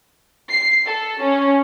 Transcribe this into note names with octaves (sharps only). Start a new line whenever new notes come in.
C7
A4
C#4